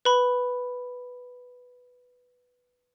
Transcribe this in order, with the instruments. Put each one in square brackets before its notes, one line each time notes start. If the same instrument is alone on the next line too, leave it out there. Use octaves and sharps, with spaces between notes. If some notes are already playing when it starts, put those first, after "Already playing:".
[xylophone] B4 B5